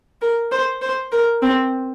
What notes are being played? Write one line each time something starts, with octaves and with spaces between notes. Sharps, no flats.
A#4
C5
C5
A#4
C4